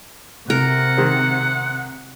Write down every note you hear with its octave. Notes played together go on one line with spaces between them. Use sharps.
C3 A#4 F#5
D#3 G#3 C4